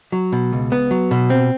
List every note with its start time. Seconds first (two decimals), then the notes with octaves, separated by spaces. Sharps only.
0.12 F#3
0.32 B2
0.52 C#2
0.72 B3
0.91 F#3
1.11 B2
1.30 C4